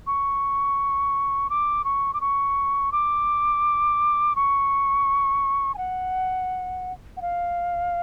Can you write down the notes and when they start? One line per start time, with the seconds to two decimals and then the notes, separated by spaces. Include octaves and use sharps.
0.07 C#6
1.50 D6
1.84 C#6
2.14 D6
2.21 C#6
2.92 D6
4.36 C#6
5.74 G#5
5.78 F#5
7.17 F#5
7.22 F5